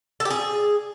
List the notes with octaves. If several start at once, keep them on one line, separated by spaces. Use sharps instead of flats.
A4
G4
G#4